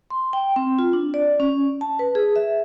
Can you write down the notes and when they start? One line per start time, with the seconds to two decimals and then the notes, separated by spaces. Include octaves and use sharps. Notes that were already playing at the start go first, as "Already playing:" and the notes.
0.10 C6
0.33 G5
0.56 C4
0.79 F4
0.93 D4
1.14 D5
1.40 C#4
1.81 A5
1.99 B4
2.15 G#4
2.36 E5